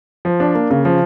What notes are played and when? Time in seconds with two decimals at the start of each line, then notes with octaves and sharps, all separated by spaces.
0.25 F3
0.40 D4
0.55 A#3
0.70 C#3
0.85 F3